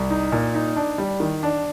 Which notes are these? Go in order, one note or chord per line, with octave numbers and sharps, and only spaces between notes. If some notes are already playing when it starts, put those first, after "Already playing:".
Already playing: C2
D#4
A#2
D#4
D4
G3
D#3
D4